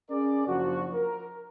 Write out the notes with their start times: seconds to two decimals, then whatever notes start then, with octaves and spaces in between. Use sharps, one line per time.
0.10 C#4 G#4 A#4 D5
0.47 F#1 F3 D4 F#4
0.93 A#4